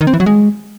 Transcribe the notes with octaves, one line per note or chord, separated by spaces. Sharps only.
D#3
C4
E3
F#3
G#3